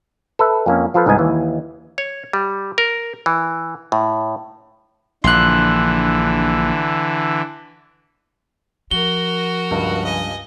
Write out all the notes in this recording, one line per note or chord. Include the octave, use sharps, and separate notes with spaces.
A4 B4 E5
F2 A#3 C#4
F3 F4 A4 B4
C2 G#2 B3 D#5 G#5
D#2 E3
C#5
G3
A#4
E3
A2
A#1 D3 E3 C6 F#6
F3 F#4 A#4 G7
C#2 G2
D#5 G#5